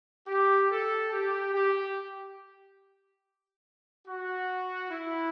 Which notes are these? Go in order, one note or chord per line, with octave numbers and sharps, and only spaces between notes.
G4
A4
G4
G4
F#4
E4